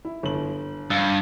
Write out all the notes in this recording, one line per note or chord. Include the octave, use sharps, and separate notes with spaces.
E4
G1 F#7
G2 F5 E6 A6